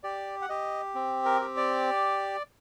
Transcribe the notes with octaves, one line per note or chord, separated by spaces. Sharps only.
G4 D5
F#5
G4 D#5
C4
A#4
G4
D5